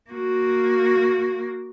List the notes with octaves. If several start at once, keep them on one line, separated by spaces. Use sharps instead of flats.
A#3 F#4